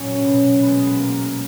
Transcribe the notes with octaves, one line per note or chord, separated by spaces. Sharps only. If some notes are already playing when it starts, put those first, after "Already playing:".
Already playing: A#2 F#3 C#4
B2
G#3 B3
A#3